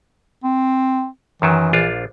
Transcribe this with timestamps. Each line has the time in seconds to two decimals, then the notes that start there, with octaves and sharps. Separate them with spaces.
0.44 C4
1.42 F#2 D#3 E3 F#3
1.73 A#1 D4 F4